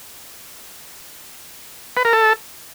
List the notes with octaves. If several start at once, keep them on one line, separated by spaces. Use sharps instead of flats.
B4
A#4
A4